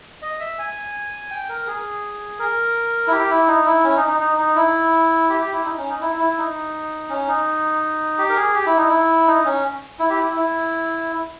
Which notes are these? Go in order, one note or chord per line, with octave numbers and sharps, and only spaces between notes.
D#5
E5
G#5
G5
A#4
G#4
A#4
E4
G4
E4
D#4
E4
C#4
D#4
D#4
D#4
D#4
E4
G4
G4
E4
D#4
C#4
D#4
E4
E4
D#4
C#4
D#4
G4
A#4
G#4
G4
E4
D#4
E4
D#4
C#4
E4
G4
E4
E4